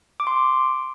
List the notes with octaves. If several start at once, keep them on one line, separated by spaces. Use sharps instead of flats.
D6
C6